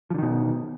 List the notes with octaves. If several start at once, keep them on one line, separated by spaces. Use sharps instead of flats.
B2 D3 D#3 F3